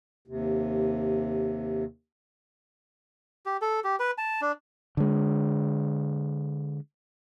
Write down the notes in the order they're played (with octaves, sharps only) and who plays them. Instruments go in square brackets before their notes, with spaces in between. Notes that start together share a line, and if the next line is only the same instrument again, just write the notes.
[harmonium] D#2 C3
[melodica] G4
A4
G4
B4
A5
D4
[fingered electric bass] D3 G#3